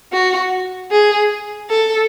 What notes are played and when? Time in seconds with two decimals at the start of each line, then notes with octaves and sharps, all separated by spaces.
0.13 F#4
0.91 G#4
1.70 A4